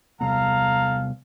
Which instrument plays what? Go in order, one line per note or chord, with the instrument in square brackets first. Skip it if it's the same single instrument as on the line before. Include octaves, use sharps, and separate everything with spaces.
[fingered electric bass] C3 G3 B3 [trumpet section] A4 F5 [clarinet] A#5